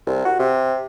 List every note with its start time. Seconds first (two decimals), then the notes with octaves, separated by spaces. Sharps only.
0.07 C2
0.25 F#4
0.39 C3